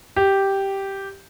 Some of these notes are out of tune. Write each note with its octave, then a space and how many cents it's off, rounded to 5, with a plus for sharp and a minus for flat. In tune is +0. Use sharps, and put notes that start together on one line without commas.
G4 -5